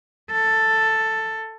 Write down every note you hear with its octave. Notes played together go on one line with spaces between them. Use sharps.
A4